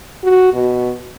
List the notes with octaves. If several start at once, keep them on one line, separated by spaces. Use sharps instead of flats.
F#4
B2